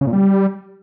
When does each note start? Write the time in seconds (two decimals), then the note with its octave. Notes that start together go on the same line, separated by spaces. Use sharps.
0.01 C#3
0.07 A#2
0.13 G3